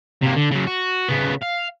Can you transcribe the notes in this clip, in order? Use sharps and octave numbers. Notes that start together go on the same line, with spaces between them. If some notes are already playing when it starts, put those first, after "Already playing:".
C3 A#3
D3
C#3 F#3
F#4
C#3 B3
F5